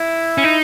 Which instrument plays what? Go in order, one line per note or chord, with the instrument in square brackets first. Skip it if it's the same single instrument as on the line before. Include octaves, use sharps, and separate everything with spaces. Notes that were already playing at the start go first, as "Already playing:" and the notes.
Already playing: [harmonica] E4
[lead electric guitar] C#4
D#4